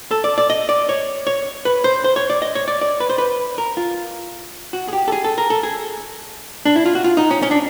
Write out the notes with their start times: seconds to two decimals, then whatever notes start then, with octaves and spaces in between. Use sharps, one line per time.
0.11 A4
0.24 D5
0.38 D5
0.50 D#5
0.69 D5
0.89 C#5
1.27 C#5
1.65 B4
1.84 C5
2.04 C5
2.16 C#5
2.30 D5
2.42 D#5
2.55 C#5
2.68 D5
2.82 D5
3.00 B4
3.10 C5
3.18 B4
3.58 A#4
3.77 F4
4.73 F#4
4.88 G#4
4.93 G4
5.08 A4
5.12 G#4
5.24 A4
5.38 A#4
5.50 A4
5.63 G#4
6.65 D4
6.76 E4
6.86 F4
6.95 F#4
7.04 F4
7.17 D#4
7.31 C#4
7.43 C#4
7.51 D4